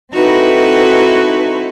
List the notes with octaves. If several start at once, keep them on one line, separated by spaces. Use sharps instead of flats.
C4 D#4 E4 F#4 A4 B4